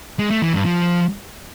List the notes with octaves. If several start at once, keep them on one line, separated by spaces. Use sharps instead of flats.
G#3
A3
E3
G2
F3